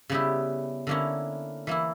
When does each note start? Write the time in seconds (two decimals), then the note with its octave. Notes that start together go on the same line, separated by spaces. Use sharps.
0.10 C#3 G3 B3 E4 G4
0.87 D3 A#3 C#4 E4
1.67 E3 A#3 E4